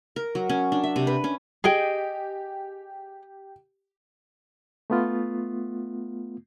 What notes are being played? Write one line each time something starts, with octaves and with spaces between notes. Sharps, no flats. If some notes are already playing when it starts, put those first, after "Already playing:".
A#4
F#3
C#4
D4
E5
C3
B4
C#4
G4 G#4 D#5 G5
A3 B3 F4